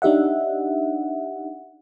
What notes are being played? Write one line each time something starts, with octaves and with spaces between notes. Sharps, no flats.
D4 D#4 G4 E5 F#5